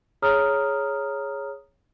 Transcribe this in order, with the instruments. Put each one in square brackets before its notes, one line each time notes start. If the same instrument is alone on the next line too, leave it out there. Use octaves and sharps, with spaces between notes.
[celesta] G#4 C#5 A#5 D#6 F6